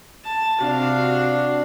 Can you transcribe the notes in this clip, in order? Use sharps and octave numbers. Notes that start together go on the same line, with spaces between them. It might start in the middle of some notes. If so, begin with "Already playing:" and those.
A5
C3 D4 F#4 F5